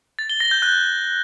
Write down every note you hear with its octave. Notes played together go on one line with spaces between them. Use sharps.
A6
G7
A#6
G6
F#6